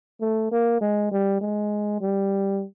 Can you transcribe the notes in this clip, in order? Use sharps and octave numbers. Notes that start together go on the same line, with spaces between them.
A3
A#3
G#3
G3
G#3
G3